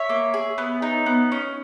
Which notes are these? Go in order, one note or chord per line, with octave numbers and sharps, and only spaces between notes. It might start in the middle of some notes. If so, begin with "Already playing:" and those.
Already playing: C#5 E5
A#3
G#4
B3
D#4
B3
C#4